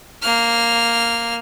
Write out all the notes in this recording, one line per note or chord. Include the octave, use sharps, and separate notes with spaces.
A#3 F6